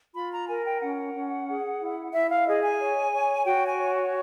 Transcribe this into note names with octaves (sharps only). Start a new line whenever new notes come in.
F4 B5
A#5
A#4 G#5
G5
C#4 F#5
C#4
G#4
E4
E4 E5
F5
G#4 D#5
G#5
C#5
C#5
F#4 G5
G#5
C#5